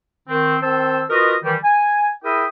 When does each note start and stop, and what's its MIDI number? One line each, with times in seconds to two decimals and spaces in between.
0.28 0.56 51
0.28 0.56 60
0.62 1.03 51
0.62 1.03 60
0.62 1.03 72
0.62 1.03 81
0.62 1.03 88
1.10 1.35 65
1.10 1.35 66
1.10 1.35 70
1.10 1.35 71
1.10 1.35 75
1.44 1.56 51
1.44 1.56 52
1.44 1.56 55
1.63 2.10 80
2.24 2.45 64
2.24 2.45 68
2.24 2.45 70
2.24 2.45 76
2.24 2.45 79
2.24 2.45 87